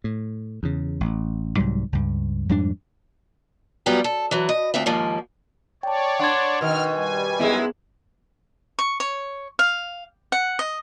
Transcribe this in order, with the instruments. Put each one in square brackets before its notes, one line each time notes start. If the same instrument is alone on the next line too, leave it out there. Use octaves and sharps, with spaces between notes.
[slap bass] A2
E2 C#3
A1
C2 G#2 F#3 G3
C#2 G2
F2 G#2 G3 D4
[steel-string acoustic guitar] G#2 F#3 G3 B3 F4 G4
A4
E3 F#3
D#5
D2 C4 F4 E5
D#2 G#2 F3 A#3
[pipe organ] C#5 D5 [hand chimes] G5 A5
[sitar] D4 [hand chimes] F#5 C6 G#6
[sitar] B2 D#3 [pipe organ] F6
[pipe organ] G3 G#5
[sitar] F#2 G#3 E4 [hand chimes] B3 G#4
[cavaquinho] C#6
C#5
F5
F#5
D#5